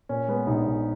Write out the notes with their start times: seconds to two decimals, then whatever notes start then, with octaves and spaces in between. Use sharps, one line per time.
0.09 A#2 C#4
0.28 G#3 B3
0.47 A#1 D#4
0.66 A#1